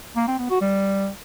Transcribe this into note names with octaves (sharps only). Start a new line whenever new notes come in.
A#3
C4
B3
F#4
G3